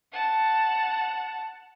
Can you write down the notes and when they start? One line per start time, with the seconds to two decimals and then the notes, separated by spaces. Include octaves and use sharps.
0.13 F#5 A5